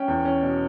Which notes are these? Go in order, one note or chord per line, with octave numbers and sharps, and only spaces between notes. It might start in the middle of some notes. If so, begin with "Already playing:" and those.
Already playing: C#4 G5
E2
C#4
B2